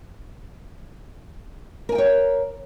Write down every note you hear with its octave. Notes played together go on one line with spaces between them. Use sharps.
A#4 C#5 G5 G#5